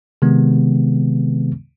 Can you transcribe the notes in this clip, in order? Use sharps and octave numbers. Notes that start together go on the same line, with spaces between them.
C3 D#3 G#3 B3